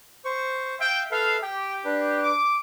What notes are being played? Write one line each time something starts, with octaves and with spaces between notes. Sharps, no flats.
C5 C#6
E5 F5 G5
A4 B4 E5 F5
G4 G5
D4 B4
D6